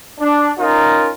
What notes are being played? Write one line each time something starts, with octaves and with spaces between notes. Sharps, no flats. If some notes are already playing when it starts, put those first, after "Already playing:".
D4
C#4 D#4 F4 A#4